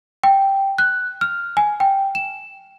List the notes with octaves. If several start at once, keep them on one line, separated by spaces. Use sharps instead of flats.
G5
F#6
F6
G#5
G5
E7